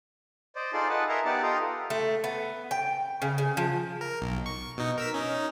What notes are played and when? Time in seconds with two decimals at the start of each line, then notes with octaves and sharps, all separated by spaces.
0.56 C5 D5 D#5
0.73 D#4 F4 G#4 A4 D5 C6
0.89 B4 D#5 F#5 A5
1.09 A#4 D#5 E5 G#5 A#5 C6
1.25 B3 D#4 G4 D5 F#5 A5
1.43 F4 G4 A4 A#5 C6 D#6
1.90 A3
2.24 B3
2.71 G5
3.22 C#3
3.38 C#3
3.57 F3
4.01 A#4
4.22 B1
4.46 C#6
4.77 B2 D#4
4.98 A#4 E6 B6
5.14 C#4 D#4